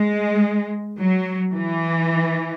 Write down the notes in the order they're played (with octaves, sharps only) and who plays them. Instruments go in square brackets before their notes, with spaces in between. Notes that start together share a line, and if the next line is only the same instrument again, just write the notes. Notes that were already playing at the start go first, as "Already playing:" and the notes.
Already playing: [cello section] G#3
F#3
E3